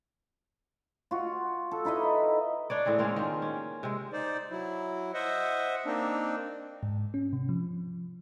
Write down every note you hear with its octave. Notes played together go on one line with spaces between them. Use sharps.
F4 F#4
A4
D#4 E4 B4 D#5
D4 C#5 D5
A2 E3 C4 G#4
G#3 A#3 C4 C#4
D#3 F4
C#4
C3 G#3
D#4 C5 D5
F#3 E4
C5 D#5 E5 F#5
A#3 C4 D4 D#4
G#2
C#4
C3
F3